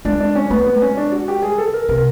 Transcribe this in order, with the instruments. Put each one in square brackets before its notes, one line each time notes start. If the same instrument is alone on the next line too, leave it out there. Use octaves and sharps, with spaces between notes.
[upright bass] G#3 [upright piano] D4
[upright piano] D4
C#4
[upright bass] A3 [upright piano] B3
[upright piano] B3
[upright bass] G#3
[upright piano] C#4
D4
F#4
G4
[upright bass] G3 [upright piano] G#4
[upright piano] A4
A#4
[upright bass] C3 [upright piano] A#4